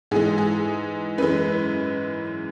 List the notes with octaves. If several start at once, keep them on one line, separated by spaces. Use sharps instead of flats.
G#2 E3 G#3 G#4
G#4
F#2 E3 G#3 B4